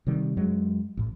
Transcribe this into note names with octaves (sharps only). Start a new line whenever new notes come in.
C3 D#3 G3
F#2 F#3 G#3
A1 A2